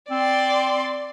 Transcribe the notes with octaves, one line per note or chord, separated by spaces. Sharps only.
C4 D5 C6